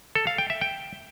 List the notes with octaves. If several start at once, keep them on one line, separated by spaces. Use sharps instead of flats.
A4
F5
G5
E5
G5